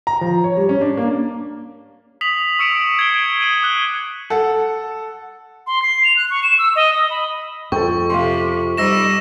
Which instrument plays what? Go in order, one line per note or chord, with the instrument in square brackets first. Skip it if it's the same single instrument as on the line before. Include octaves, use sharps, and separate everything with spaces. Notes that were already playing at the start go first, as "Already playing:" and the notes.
[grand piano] A#5
F3
C#5
G3
C#4
D4
A#3
[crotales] D#6 B6 F7 F#7
C#6 E6 C#7 D7 E7 F7
G#6 C7 D7 G7
D#6 D#7 F#7
D6 F#6 G7
[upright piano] A4 F#5
[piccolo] C6
C7
F7
F#6
C#6
E7
E6
D#5
D#6
B5
[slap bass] F2 [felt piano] A4 G5 [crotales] C#6
[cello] C3 [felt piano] F5 C6
[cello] G3 D#5 [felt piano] D#4 C5 [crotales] E6 A#6 E7